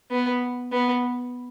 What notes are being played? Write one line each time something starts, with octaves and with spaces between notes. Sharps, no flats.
B3
B3